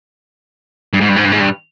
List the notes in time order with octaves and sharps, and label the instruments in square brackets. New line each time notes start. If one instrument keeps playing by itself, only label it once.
[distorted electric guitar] G2
G#2
G2
G#2
G2
G#2
G2